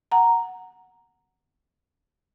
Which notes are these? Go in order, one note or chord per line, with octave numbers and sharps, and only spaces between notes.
F#5 A#5